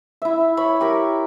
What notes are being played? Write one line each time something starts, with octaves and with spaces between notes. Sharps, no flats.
E4 E5
C#5 B5
G4 A#4